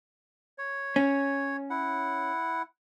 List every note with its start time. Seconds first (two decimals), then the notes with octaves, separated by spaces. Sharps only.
0.58 C#5
0.96 C#4
1.70 E4 F#5